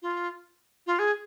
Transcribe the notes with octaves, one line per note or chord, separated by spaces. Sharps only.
F4
F4
G#4